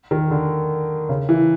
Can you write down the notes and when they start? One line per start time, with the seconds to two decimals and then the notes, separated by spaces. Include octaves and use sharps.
0.11 D#3
0.31 D3
1.09 C#3
1.29 E3